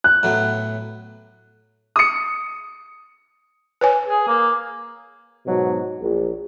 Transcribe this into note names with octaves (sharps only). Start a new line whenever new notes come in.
F#6
A2 F#3 B3
D#6 C#7
B4 C#5 G#5
G#4
A#3
G#2 B2 F#3
A#1